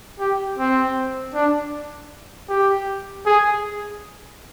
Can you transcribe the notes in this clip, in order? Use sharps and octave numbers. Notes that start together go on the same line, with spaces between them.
G4
C4
D4
G4
G#4